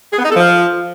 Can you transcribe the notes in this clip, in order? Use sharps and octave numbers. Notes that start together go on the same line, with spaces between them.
G#4
B3
D#4
A4
F3